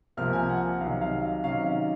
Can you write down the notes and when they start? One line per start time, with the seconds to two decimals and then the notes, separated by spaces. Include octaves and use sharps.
0.17 C2 C3 F3 A#3 F4 F6
0.33 G#5
0.49 F#5
0.81 C2 C3 D#3 F#3 F5
1.01 F5
1.44 C3 D#3 F#3 C#4 F5